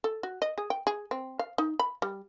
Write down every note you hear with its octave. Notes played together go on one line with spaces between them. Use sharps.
A4
F#4
D#5
G#4
G5
G#4
C4
F5
D#4
B5
G3